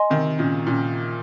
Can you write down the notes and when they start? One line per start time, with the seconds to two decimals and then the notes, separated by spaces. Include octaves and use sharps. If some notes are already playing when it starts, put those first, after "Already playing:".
Already playing: D#5 G#5 C6
0.10 C3 D#3
0.38 A#2 C#3
0.66 A#2 C#3